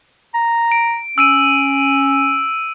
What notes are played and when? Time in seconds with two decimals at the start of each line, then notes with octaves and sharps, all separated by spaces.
0.34 A#5
0.72 D7
1.18 C#4 E6 D7 D#7